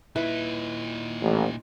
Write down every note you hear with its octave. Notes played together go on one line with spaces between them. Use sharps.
A#2 D#4 E4 B4
A1